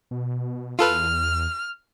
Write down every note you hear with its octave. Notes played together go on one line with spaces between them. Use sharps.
B2
E2 F4 A4 B4 F6